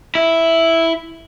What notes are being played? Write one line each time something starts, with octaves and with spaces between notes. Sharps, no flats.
E4